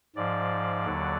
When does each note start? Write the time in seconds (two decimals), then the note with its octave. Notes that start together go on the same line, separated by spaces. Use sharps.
0.16 G#2 F3 D5
0.86 D#2 D3 F#3